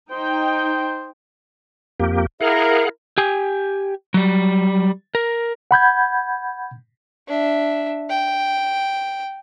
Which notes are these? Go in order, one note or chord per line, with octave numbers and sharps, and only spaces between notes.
D#4 C5 G5
F2 A#3 G4
E4 G#4 A#4 F5 F#5
G4 G#5
F#3 G3
A#4
F#5 B5 G6 G#6
D4 E5
G5